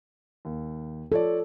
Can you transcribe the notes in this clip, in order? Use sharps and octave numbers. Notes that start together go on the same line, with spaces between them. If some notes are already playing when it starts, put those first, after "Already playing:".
D#2
F3 A4 C#5 D5